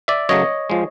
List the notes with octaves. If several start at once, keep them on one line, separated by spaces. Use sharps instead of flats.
D5 E5
F#2 C#3 F#3 A3 C#5 D#5
F3 G#3